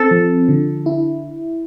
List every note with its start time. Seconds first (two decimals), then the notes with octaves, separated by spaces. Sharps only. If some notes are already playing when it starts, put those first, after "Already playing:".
Already playing: C4 A4
0.11 F3
0.49 D3
0.86 E4